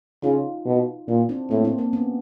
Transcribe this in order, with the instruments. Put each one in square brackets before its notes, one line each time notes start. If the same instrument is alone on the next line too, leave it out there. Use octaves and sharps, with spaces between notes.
[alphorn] C#3 [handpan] D#4 F4
[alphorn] B2
[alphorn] A#2 [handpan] D4 E4
[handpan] C4 D4
[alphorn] A2 [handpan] A#3 C4
[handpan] C4 D4
A#3 C4
B3 C#4